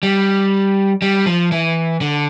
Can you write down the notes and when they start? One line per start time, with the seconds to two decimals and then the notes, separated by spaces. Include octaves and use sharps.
0.03 G3
1.02 G3
1.26 F3
1.52 E3
2.01 D3